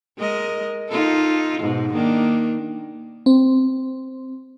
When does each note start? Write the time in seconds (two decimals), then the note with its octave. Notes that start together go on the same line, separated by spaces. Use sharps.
0.18 G#3 A#4 D#5
0.89 D#4 F4 A4
1.61 G#2 B2
1.93 D#3 A#3 D4
3.26 C4